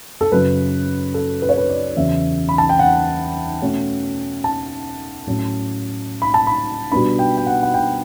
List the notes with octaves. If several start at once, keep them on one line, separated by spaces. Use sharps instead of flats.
A4
F#2 C#3 F#3 B4
A4
B4
C#5
B4
D5
E2 C#3 F#3 C#4 E5
B5
A5
G5
F#5
B2 A3 C#4
A5
A2 F#3 A3 C#4
B5
A5
B5
B2 G3 B3 D4 B5
G5
G5
F#5
F#5
G5